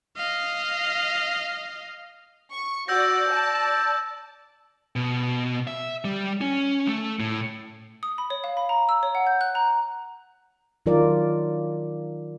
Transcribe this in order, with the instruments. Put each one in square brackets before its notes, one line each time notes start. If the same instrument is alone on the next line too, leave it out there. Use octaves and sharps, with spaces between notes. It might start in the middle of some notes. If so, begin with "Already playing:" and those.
[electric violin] D#5 F5
[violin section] C#6
[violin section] F#4 D5 [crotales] E6 G6 A#6
[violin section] D5 A5
[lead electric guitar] B2
E5
G3
C#4
A3
A2
[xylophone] D#6
B5
C#5
F5
B5
A#5
E6
C#5
F#5
G6
F#6
A#5
[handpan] D#3 F#3 D#4 F4 A#4 D5